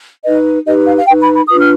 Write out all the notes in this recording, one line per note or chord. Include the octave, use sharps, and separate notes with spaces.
D#4 B4 D#5
D#4 G4 B4 D#5
F5
F5
D#4 B4 G5
B5
B5
D4 F4 B4 D#6
F6